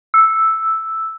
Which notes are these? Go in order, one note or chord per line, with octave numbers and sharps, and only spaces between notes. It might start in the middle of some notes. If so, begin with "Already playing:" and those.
E6